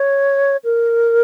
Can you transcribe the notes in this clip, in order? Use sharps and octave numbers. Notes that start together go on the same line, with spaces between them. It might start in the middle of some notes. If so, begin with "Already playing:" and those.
Already playing: C#5
A#4